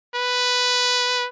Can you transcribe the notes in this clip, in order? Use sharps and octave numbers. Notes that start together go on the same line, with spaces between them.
B4